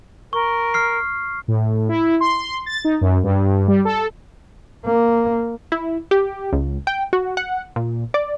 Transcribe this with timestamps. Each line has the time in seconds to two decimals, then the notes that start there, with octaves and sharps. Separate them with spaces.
0.33 A#4 C#6
0.74 F6 C7
1.48 A2
1.89 E4
2.21 C6
2.66 A6
2.85 D#4
3.01 F#2
3.24 G2
3.68 G3
3.85 A4
4.85 A#3
5.72 E4
6.11 G4
6.53 C#2
6.87 G5
7.13 F#4
7.37 F#5
7.76 A#2
8.14 D5